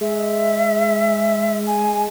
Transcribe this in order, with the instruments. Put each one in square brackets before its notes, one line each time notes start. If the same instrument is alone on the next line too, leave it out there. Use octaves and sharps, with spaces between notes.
[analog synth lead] G#3 [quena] E5
[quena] G#5